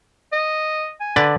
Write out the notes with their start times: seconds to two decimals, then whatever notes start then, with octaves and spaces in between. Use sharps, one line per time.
0.32 D#5
1.00 G#5
1.16 D3 B4 D5